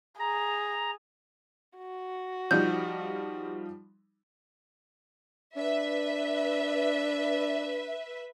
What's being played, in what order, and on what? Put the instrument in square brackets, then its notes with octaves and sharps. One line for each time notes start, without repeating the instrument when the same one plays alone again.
[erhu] G#4 [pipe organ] A#5
[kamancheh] F#4
[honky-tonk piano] F3 G3 D#4 [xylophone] G6
[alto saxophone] D4 [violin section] B4 E5